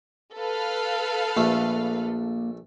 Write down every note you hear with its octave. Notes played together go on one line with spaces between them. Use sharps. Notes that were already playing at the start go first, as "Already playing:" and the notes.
A4 B4 F5
A#1 A3 A#3